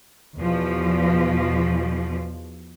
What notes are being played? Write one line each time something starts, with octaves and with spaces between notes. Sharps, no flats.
E2 B2 F3